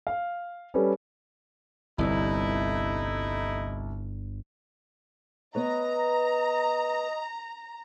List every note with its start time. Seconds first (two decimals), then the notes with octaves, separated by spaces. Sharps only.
0.07 F5
0.74 G3 C#4 A4 B4
1.98 G1 C2 A3 D#4 E4
5.55 B3 B4 C#5 D#5 A#5